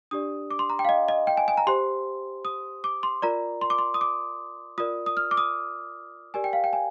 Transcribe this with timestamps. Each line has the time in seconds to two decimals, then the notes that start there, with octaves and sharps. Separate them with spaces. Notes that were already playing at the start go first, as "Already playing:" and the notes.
0.11 D4 G4 D5 D#6
0.50 D6
0.59 C6
0.70 A#5
0.79 G5
0.85 F5
0.89 D#5
1.08 D#5
1.27 G5
1.37 G#5
1.48 G#5
1.57 A#5
1.67 G4 C5 C6
2.45 D#6
2.84 D6
3.03 C6
3.22 F4 A#4 D5 A#5
3.61 C6
3.70 D6
3.78 C6
3.94 D#6
4.01 D6
4.78 F4 A#4 D5 D#6
5.06 D#6
5.17 F6
5.31 D6
5.37 D#6
6.34 G4 A#4 D5 G#5
6.44 G5
6.53 F5
6.64 G5
6.73 G#5